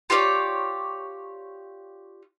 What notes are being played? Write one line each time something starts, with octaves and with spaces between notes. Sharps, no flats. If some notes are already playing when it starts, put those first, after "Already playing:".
F4 G4 C#5 D5